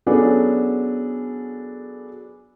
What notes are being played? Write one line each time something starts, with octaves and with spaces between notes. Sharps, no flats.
F#3 B3 C#4 D4 G#4 A4